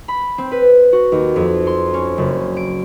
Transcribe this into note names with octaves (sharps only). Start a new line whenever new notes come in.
B5
C4
B4
F#4
D#2
F2
C6
C#4
F#1
D7